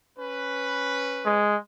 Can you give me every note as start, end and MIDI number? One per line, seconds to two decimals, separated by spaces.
0.18 1.57 61
0.18 1.57 71
1.25 1.56 56